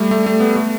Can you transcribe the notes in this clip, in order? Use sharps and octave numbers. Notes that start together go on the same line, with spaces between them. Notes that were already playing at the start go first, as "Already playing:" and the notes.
Already playing: G3 A3
A3
A3
B3
A3